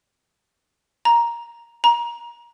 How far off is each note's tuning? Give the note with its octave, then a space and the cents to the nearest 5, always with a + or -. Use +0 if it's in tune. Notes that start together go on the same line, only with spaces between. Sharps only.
A#5 +10
A#5 +25